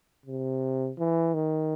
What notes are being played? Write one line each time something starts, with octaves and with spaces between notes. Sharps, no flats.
C3
E3
D#3